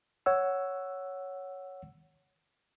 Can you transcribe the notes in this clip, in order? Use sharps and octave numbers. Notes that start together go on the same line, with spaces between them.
C#5 F#5 E6